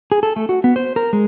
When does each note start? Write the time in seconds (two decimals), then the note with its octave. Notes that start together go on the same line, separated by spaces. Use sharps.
0.12 G#4
0.23 A4
0.36 A3
0.49 F#4
0.64 B3
0.76 C5
0.96 A#4
1.13 G#3